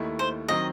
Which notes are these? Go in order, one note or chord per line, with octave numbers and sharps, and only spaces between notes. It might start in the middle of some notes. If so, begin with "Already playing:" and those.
Already playing: D#2 D#3 A3 E4
C5
D#3 F#3 C4 D#5